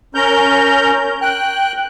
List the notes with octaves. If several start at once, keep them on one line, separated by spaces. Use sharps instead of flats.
C#4 A#4 A#5 G6
G5 F#6